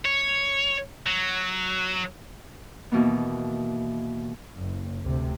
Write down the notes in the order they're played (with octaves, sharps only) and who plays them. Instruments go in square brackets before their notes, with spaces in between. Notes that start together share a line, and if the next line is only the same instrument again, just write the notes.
[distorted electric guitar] C#5
F#3
[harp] D#2 B2 E3 A#3 B3
[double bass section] F#1
D2 C3